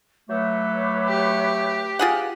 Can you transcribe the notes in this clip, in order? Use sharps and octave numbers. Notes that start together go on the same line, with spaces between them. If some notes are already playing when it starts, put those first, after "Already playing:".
F#3 A3 B4 C#5 D6
G4
F4 G#4 F#5